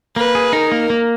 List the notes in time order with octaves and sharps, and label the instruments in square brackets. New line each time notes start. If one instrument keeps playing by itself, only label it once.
[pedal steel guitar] A#3 [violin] B4
[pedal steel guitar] G#4
[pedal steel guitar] D#4 [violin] A#4
[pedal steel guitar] A#3
A#3